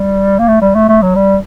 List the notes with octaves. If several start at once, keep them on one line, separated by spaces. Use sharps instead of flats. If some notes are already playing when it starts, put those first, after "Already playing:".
Already playing: G3
A#3
A3
G3
A3
A3
F#3
G3